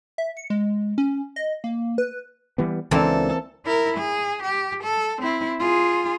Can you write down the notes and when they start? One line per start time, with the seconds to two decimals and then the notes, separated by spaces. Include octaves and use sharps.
0.18 E5
0.37 C#7
0.50 G#3
0.98 C#4
1.36 D#5
1.64 A#3
1.98 B4
2.58 E3 G3 B3
2.91 C#2 E3 A#3 C4 D4 A4
3.66 E4 A#4
3.98 G#4
4.43 G4
4.84 A4
5.22 C4 E4
5.59 F4 G#4